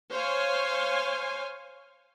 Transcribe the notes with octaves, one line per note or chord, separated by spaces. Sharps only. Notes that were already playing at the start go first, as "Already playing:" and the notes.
C5 C#5 F5 G#5